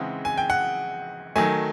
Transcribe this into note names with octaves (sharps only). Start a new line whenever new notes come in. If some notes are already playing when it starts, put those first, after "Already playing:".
Already playing: C#3 E3 G#3 C4 D#4 F#5
G#5
G5
F#5
D#3 F#3 A3 G#5